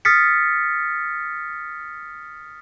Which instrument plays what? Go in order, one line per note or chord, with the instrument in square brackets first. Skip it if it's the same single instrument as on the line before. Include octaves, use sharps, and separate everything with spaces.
[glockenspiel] D#6 F6 A6 B6 C#7